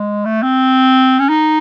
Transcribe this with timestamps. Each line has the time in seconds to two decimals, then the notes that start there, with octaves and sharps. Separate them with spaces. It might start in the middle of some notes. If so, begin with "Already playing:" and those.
Already playing: G#3
0.25 A3
0.43 C4
1.19 C#4
1.29 D#4